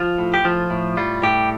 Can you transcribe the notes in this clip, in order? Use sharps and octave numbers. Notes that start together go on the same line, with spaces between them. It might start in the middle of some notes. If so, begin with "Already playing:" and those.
Already playing: F3 F4
A2
G4
F3 F4
A2
G3 F4
A2 G4